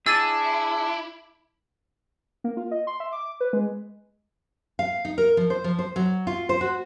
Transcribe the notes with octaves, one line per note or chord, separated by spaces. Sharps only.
D4 E4 G#4 E6 A6 D#7
A#3
F4
D#5
C6
E5
D6
B4
G#3
F5
D#4
A#4
F3
C5
F3
C5
F#3
F4
C5
F#4